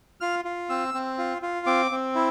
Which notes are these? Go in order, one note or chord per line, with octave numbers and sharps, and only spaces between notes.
F4 F6
F4
C4 E6
C4
F4
F4
C4 D6
C4
E4